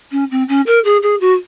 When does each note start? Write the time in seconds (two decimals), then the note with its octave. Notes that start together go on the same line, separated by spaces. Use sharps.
0.12 C#4
0.31 C4
0.48 C#4
0.67 A#4
0.85 G#4
1.03 G#4
1.20 F#4